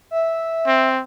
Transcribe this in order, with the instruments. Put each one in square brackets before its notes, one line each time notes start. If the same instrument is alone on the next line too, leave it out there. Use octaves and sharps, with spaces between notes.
[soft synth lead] E5
[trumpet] C4